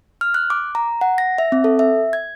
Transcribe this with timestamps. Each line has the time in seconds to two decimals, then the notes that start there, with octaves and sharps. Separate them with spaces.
0.21 F6
0.34 F#6
0.50 D6
0.75 A#5
1.01 F#5
1.18 A#6
1.38 E5
1.52 C4
1.64 A4
1.79 E5
2.13 G#6